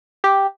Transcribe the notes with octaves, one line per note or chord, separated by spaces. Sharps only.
G4